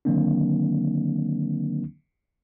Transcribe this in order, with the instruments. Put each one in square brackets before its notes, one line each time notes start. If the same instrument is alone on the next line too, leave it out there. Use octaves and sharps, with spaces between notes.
[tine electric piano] D3 D#3 F#3 A#3 C4 D4